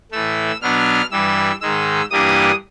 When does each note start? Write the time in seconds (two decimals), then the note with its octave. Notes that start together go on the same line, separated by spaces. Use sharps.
0.12 A2 E3 A3 E6
0.61 B2 F#3 B3 D4 F6
1.11 G2 E3 G3 E6
1.61 G#2 D#3 G#3 E6
2.11 G2 E3 G3 A#3 D4 D#6